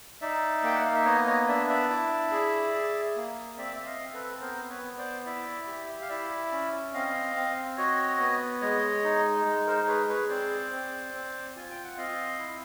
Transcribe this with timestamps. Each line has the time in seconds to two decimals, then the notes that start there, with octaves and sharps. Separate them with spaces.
0.21 D#4 D5 E5
0.63 A#3 G5
0.75 F#5
0.85 F5
0.95 E5
1.05 B3 C#5 D#5
1.26 C#5 D#5
1.48 D4 D5 E5
1.69 D5 E5
1.89 E4
2.32 G#4
2.74 G#4
3.16 A#3
3.57 C4 D5 E5
3.76 E5
3.85 D#5 F5
4.00 C4
4.13 A4 B4
4.41 B3 A#4 C5
4.69 B4 C#5
4.83 B3
4.98 C5 D5
5.25 E4 D5 E5
5.67 G4
6.01 F5
6.09 E4 D5 E5
6.52 C#4
6.94 C4 D#5 F5
7.36 C4
7.77 F#4 C#5 D#5
8.20 B3
8.61 G#3 C#5 D#5
9.04 D#4
9.46 G#3
9.67 A#4 C5
9.87 G#4 B4 C#5
10.09 B4 C#5
10.29 C4 C5 D5
10.72 C4
11.13 C4
11.56 F4 G#5
11.70 G5
11.84 F#5
11.97 C4 D#5 F5
12.39 E4